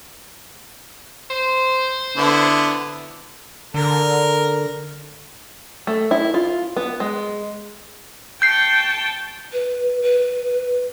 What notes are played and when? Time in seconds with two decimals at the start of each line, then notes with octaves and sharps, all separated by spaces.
1.30 C5
2.17 D3 B3 E4
3.74 D3 A#4
5.87 A3
6.11 E4
6.34 F4
6.77 B3
7.00 G#3
8.42 G5 A5 C#6 G6 C7
9.53 B4
10.03 B4